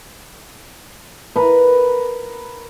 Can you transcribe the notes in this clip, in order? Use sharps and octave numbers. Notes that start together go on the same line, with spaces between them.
A#4 B4